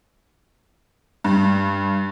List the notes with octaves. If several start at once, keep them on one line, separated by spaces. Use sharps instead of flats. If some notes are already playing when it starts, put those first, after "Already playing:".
G2